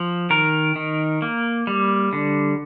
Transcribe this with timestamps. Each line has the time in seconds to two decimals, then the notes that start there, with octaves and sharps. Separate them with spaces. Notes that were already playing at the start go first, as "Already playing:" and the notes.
Already playing: F3
0.30 D#3 A#4
0.76 D#3
1.22 A#3
1.67 G3
2.13 D3